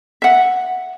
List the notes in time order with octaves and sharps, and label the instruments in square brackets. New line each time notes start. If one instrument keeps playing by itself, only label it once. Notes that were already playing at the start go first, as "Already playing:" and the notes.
[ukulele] E5 F#5